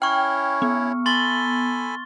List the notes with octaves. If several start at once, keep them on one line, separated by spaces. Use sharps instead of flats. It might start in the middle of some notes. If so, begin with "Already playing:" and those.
C#4 E4 C#5 G5 C#6 F6
B3
A4 G#5 B5 C6 A6 G7